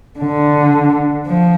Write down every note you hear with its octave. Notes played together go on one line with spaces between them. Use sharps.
D3
F3